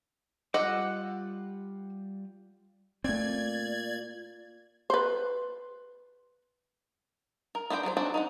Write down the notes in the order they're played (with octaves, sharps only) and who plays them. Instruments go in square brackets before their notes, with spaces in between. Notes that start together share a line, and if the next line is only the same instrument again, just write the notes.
[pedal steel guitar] G3 F4 D6 [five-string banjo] D#5 [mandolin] F#5 E6
[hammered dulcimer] A#2 [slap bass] A3 C4 [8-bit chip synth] D5 [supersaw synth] G#6
[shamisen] B4 C5
[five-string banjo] A#4
B3 D4 C5 D#5 G5
F#3 G4 A4 C5
B3 C4 D4 D#4 F#4
D#4 B4 F#5